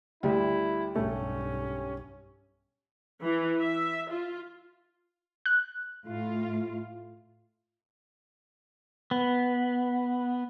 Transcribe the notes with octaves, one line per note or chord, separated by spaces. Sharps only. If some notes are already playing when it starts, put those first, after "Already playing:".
D2 G3 E4
B1 G2 A3 C#4
E3
E5
F4
F#6
A2 F4
B3